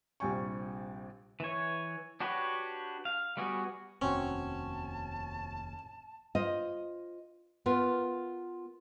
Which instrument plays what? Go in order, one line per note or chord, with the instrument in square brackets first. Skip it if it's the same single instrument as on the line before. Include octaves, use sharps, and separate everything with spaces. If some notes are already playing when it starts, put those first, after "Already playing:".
[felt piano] A#1 C3 G3 G5 G#5 C#6
[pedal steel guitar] E3 C#5
D4 F#4 G4 B4 C#5
F5
G3 B3 F#4 G#4
[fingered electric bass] F1 D#2 [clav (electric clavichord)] C4 F#4 [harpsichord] C#4 [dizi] A5
[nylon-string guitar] F4 C5 D#5
B3 F4 A#4